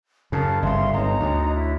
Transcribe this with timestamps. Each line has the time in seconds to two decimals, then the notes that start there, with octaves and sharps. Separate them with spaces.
0.32 F#2 C#3 A#4 A5
0.62 G1 C#3 E5 F5 C6
0.94 G1 D#4 C#5 A#5
1.20 D2
1.53 E4